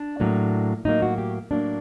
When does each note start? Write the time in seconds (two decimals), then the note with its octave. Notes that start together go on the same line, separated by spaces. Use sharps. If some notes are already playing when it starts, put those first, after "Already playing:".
Already playing: D4
0.20 A2 F#3 A#3
0.85 A2 F#3 A#3 D#4
1.02 F#4
1.18 G4
1.51 A2 F#3 A#3 D4